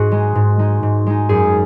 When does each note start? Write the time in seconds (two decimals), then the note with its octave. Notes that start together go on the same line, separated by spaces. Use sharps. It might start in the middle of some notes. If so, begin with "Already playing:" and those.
Already playing: G#2 F#4 G#4
0.12 G#3 D#4
0.35 G#2
0.59 G#3 D#4
0.83 G#2
1.07 G#3 D#4
1.29 F#2 G#4